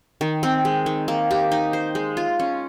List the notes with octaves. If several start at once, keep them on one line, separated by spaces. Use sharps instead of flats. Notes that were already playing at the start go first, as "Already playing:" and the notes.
D#3
C4
G#3
D#3
A#3
G4
D#4
C5
G#3
F4
C#4